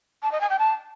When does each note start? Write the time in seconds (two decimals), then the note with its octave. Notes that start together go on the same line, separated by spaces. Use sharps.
0.23 A5
0.32 D#5
0.41 G#5
0.50 G5
0.59 A5